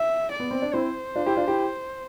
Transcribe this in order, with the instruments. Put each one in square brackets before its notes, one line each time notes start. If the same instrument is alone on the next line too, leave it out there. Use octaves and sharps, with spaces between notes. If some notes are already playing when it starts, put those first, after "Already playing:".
Already playing: [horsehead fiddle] E5
D5
[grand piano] B3
C4
D4
[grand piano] C4 E4 [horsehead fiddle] C5
[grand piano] D4 F4
E4 G4
D4 F4
E4 G4